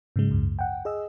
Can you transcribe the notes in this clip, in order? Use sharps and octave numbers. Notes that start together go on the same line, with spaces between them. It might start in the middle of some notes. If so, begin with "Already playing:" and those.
G#2 C#3 F#3 G#3
C#2 F#2
F#5 G5
G#4 D#5 E6